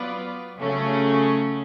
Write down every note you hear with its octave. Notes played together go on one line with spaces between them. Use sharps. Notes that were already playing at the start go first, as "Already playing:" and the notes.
Already playing: F#3 B3 F4 B4 D5
C#3 F#3 A3 C#4